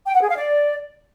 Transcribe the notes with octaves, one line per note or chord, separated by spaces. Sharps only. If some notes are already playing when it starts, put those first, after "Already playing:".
G5
F#5
G#4
F5
D5